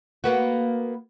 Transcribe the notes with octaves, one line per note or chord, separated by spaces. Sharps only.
A#3 B3 F#4